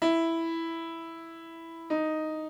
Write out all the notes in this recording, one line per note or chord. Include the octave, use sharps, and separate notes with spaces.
E4
D#4